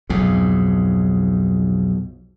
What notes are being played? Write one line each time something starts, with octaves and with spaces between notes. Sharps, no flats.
B1 F2 G#2